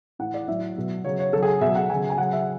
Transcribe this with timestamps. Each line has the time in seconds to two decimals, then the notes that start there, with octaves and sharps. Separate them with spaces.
0.19 A2 E3 F#5
0.34 D5
0.48 A2 F#3 E5
0.76 B2 F#3
1.05 C#3 F#3 C#5
1.19 C#5
1.33 C#3 F#3 A4
1.43 G#4
1.61 B2 F#3 E5
1.75 F#5
1.90 C#3 F#3 G#5
2.10 G#5
2.18 C#3 F#3 F#5
2.33 E5